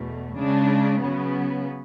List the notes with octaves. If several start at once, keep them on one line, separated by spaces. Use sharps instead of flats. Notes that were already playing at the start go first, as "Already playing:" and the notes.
Already playing: E2 B2 A3
C#3 G#3 D4
C#3 F#3 B3